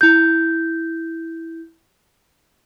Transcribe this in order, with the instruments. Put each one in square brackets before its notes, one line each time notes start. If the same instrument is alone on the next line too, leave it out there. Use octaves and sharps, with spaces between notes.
[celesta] E4 G6